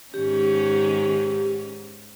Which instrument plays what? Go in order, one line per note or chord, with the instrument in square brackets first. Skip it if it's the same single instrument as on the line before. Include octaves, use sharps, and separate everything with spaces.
[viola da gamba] G#2 D#3 C#4 [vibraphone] G4